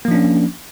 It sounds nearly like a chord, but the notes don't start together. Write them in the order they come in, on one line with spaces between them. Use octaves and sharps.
A#3 F3 D4 C#4